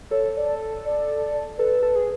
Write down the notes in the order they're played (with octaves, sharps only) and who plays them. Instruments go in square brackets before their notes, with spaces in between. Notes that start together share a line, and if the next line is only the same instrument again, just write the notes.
[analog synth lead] A4 [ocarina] C#5
[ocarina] D5
D5
[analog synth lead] A4 [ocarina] B4
[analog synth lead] A4
G#4